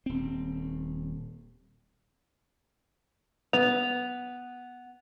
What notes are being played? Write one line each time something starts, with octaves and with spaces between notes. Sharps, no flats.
D#1 C4
B3 F7